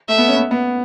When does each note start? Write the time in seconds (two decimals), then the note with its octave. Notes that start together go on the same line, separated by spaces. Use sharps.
0.08 A3 E5
0.18 B3
0.28 C#4
0.37 B3
0.51 B3